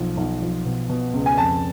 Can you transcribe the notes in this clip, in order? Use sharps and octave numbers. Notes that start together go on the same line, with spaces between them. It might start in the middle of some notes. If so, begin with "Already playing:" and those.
Already playing: B1 F3
B1
F3
B2
B2
C#2
G#5
F2 A5